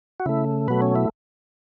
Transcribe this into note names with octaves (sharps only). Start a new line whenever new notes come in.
F#4
C#3 A3 E4
B2 F#3 A3 B4
C#4
E4